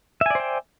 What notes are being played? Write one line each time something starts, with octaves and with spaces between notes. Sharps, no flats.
C5 D5 E5 G5 G#5